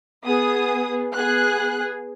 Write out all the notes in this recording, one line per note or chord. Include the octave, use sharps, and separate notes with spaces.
B3 G#4 D#6
B3 G#4 F#6